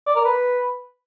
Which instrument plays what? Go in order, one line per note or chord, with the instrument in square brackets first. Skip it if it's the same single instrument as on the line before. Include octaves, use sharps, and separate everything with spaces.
[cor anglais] D5
A#4
B4